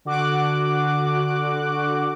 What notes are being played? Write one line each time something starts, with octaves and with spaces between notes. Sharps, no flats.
D3 F#4 D6 F#6